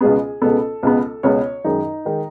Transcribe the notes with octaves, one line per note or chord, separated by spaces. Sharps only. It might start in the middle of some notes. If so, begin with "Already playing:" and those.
C#2 B2 G#3 B3 G#4
C#2 B2 G#3 B3 A4
C#2 B2 G#3 B3
C#2 B2 G#3 B3 C#5
F#2 D#3 G#3 D#4
D#3 G#3